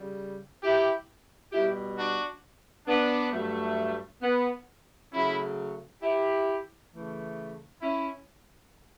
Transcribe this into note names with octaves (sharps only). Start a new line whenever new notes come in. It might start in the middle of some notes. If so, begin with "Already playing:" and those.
Already playing: C#3 G3
E4 G4
B2 G3 E4 G4
D4 F#4
B3 D4
G2 F#3 A3
B3
C#3 F#3 A3 C#4 E4
E4 G4
C#3 E3 A3
C#4 E4